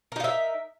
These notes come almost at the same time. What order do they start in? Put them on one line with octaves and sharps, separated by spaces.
A#4 D#4 F5 E5